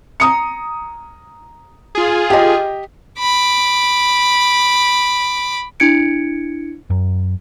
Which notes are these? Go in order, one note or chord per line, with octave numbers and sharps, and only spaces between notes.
A#5 D#6 C#7
F4 G#4
G4 D#5
B5 D6
D4 E4 G#6 C#7 D7
F#2